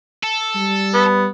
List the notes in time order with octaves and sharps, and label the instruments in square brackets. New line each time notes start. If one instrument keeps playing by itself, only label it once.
[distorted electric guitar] A4
[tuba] G3
[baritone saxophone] B3